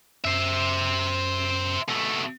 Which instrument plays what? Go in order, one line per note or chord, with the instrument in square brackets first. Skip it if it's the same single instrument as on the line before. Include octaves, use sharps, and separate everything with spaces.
[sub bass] F#2 [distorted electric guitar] C5 E5
[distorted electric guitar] B2 A3